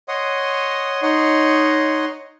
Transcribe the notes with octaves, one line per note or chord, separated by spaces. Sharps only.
C#5 D#5 F#5 C6 D#6
D#4 C#5 D#5 F#5 C6